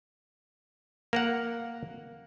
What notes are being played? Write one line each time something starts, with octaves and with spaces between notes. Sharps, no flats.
A#3 A#4 F#5